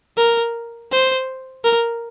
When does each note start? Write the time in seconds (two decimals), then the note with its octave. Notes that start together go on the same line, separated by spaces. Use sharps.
0.17 A#4
0.91 C5
1.65 A#4